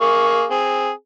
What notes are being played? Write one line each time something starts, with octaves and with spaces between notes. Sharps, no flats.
A#3 G#4 C#6
C4 G#4